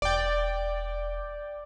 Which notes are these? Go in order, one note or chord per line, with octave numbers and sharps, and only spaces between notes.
E1 D5 G5